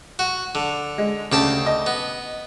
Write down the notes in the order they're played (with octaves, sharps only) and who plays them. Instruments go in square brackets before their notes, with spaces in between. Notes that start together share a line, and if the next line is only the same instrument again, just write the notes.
[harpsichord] F#4
D3
[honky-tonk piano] G#3
[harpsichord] D2 G4 A5 [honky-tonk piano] C#3
[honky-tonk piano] D#5
[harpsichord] B3